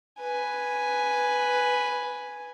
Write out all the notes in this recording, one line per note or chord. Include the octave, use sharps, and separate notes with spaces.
B4 G#5